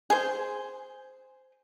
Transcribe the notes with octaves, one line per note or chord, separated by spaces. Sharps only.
G#4 C5